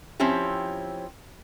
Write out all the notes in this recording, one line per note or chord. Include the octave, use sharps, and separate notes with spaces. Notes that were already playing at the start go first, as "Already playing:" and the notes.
F3 C4 C#4 E4 G4